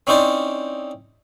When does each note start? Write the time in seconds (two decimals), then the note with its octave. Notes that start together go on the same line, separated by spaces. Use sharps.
0.07 C4 C#4 D#4 E4 C5 D5